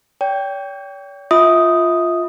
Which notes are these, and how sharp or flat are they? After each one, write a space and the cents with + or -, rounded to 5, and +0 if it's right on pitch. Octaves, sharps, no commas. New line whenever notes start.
C#5 +45 G5 +0
F4 +0 E5 -35 D#6 +0